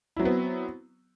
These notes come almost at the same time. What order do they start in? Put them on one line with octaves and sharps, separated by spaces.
E4 F#3 C4 B3